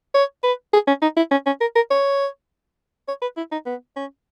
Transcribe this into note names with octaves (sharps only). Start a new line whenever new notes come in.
C#5
B4
G#4
C#4
D#4
E4
C#4
C#4
A#4
A#4
C#5
C#5
B4
E4
D#4
B3
C#4